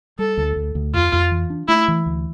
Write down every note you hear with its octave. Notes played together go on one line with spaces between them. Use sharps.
G3 A4
D2
D2
D2
F2 F4
F2
E3
D4
A3 E4
E3
D2